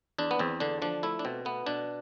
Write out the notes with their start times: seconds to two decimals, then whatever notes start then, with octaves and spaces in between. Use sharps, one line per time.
0.18 E2 D4
0.31 B3
0.39 E2 C4
0.60 D3 D4
0.82 F3 D4
1.03 A3 E4
1.19 D4
1.25 B2 C4
1.45 A3 B3
1.66 B2 D4